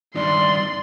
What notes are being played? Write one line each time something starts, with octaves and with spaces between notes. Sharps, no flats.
G2 D#3 D5 C6